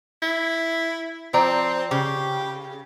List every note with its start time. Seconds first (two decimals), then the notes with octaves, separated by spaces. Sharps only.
0.22 E4
1.34 F3 C4 D5 A#5
1.91 C#3 G4